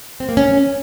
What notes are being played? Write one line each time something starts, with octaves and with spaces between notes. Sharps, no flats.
C4
A#3
C#4